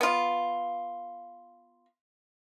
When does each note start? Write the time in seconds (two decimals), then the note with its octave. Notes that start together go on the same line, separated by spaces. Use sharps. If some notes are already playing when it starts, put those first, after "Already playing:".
0.01 B3 F4